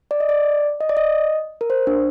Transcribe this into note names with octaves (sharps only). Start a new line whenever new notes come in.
D5
D#5
D5
D#5
D5
D#5
A#4
C5
D4